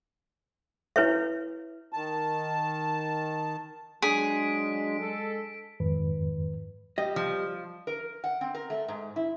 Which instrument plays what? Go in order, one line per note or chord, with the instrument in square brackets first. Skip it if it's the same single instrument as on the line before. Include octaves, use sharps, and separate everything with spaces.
[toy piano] E4 B4 C#5 E5
[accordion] D#3 A5
[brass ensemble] F#3 G#3 [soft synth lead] D4 [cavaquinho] G#4 [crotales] B6 D7
[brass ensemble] G#3 A4
[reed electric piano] F2 G#2 D#3 B4
[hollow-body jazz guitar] G3 D#5
[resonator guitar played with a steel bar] F3
A#4
F#5
C4
A#4
A3
G#2
E4